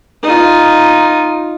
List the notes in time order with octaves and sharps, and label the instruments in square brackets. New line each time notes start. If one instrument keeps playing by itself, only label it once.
[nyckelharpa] D#4 F4